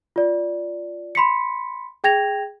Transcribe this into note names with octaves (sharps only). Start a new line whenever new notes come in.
F4 D5
B5 C6 B6 C#7
G#4 G5 G#6 A#6 F7